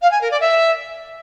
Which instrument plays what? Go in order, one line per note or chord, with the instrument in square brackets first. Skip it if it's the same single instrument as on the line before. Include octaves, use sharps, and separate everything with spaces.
[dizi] F5
G#5
A#4
D5
E5